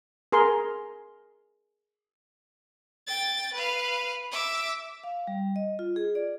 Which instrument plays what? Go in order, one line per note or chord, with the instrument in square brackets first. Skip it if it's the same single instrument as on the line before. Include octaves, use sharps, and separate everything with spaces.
[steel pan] G#4 A#4 C6
[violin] G5 A6
B4 F5
E5 D6
[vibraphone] F5
G3
D#5
F4
G#4
D5